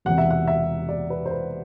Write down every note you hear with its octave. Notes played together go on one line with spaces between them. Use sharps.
E1 E2 C3 F#5
E5
F#5
E5
D5
B4
C5
B4